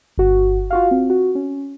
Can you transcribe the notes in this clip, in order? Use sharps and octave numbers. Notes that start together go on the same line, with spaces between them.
G1 F#4
F4 F#4 F5
C4
F#4
C#4